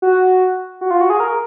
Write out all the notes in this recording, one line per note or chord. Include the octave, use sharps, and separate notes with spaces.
F#4
F#4
F4
F#4
G#4
A#4